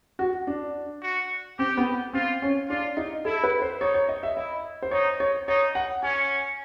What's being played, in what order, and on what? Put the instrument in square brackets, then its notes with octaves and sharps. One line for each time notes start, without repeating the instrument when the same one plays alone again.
[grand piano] F#4
D4
[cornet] F#4
[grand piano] C4 [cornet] G4
[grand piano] B3
[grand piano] C4 [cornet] F4
[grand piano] C#4
[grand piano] D4 [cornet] F4
[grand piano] D#4
[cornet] E4 [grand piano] A4
[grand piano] B4
C5
[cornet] D#4 [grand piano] C#5
[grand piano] C#5
D#5
E5
[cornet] E4 [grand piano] D#5
[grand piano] C5
[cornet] D#4 [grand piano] C#5
[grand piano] C#5
[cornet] D#4 [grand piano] C#5
[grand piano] F#5
[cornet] C#4 [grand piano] G#5